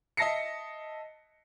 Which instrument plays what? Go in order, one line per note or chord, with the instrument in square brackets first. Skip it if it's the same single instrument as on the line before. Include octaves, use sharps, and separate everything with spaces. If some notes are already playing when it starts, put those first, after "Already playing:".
[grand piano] D#5 E5 A5 A#6 C7 C#7